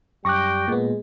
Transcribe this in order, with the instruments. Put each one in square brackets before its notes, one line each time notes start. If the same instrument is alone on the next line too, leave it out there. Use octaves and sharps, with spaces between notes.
[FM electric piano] F#2 A#6 [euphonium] G3 [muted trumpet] G5 [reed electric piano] C#6 D6 F#6
[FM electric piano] A#2 B3 [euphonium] G#3